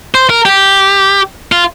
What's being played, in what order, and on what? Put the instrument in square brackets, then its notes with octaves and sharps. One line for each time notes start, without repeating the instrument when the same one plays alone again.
[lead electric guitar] C5
A#4
G4
F4